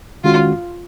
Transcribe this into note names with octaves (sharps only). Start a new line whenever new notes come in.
D#3 G#3 C#4 F4 F#4